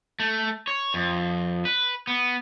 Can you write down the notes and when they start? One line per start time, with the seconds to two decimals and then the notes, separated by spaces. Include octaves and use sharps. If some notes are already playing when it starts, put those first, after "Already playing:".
0.20 A3
0.67 C#5
0.94 F2
1.65 B4
2.07 B3